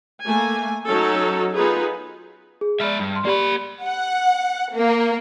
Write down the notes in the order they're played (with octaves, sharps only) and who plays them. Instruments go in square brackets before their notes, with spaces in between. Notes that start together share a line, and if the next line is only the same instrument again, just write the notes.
[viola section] A3 A#3 G#5
F#3 C#4 D#4 A4
B3 D#4 F4 G#4 B4
[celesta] G#4
[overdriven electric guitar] G#3 E5 [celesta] D5 B5 F6
[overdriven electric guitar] G2
[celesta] C6 F6
[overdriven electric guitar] A#3 B5 [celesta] G4 D5
[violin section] F#5
A#3